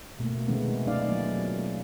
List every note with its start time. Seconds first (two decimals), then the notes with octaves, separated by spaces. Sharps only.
0.20 B2 A3 A#3
0.48 C3 D#3 G#3 A3 B3 C#4
0.86 F#3 A3 C#4 D#4 D5 F5
1.09 F#3 A#3